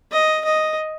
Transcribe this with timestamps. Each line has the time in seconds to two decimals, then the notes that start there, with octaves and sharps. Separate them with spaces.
0.12 D#5
0.45 D#5